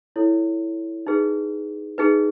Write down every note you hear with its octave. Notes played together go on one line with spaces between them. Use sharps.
E4 A4 C#5
D#4 G#4 B4
D#4 G#4 B4